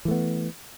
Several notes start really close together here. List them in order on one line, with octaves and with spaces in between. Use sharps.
E3 A3 B3